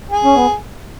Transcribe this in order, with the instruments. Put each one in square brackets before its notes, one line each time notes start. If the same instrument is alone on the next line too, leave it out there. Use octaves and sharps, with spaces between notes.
[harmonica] G#4
[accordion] C#4
B3